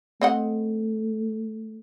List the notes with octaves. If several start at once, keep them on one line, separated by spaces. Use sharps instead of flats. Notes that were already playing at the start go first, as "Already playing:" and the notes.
A3 C4 D#5 F#5